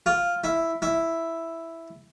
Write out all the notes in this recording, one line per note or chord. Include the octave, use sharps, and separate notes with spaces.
F4
E4
E4